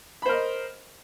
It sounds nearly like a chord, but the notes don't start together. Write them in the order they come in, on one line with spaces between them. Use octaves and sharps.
B5 C5 A#4 D#5